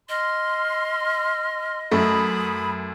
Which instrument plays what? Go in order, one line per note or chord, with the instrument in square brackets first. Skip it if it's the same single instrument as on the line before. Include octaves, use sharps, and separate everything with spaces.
[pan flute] D#5 [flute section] C6 F6
[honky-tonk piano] F#2 A3 [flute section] B5 D#6